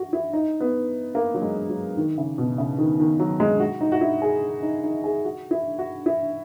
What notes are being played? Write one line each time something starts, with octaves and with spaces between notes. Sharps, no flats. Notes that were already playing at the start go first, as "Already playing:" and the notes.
Already playing: F#4
E4
D#4
B3
A#3
F#3
G#3
F#3
D#3
C#3
B2
C#3
D#3
D#3
F#3
G#3
F#4
D#4
F#4
E4
G#4
D#4
D#4
G#4
F#4
E4
F#4
E4